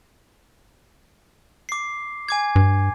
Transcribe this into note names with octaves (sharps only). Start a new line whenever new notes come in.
D6 C7
G#5 D6 G#6
G2